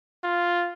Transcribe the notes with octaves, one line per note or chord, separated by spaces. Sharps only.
F4